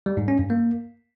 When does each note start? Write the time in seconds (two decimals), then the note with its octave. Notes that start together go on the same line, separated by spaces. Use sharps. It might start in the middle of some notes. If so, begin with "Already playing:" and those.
0.06 G3
0.17 G#2
0.28 C#4
0.39 G2
0.50 A#3